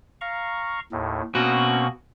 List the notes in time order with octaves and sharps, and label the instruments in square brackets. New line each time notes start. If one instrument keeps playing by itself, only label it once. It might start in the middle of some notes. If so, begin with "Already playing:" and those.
[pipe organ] F5 A#5 C#6
D#2 A2
[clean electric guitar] B2 F#4 [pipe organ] A#3 C4 C#4